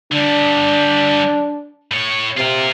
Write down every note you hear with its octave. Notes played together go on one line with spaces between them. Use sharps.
D3 G3 D4
A2 C#5
C3 F4 A#4